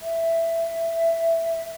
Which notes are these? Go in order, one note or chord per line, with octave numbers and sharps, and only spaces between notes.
E5